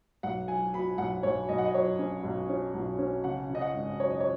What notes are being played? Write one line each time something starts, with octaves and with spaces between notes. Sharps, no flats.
B1 F#5
F#3 G#5
B2 B5
B1 F#5
B1 C#5
B1 D#5
F#5
D#5
F#3 C#5
C#4
B1
C#4
B1
C#4
C#3 F#5
C#3
D#5
F#5
G#1
F#2 C#5
D#5
C#5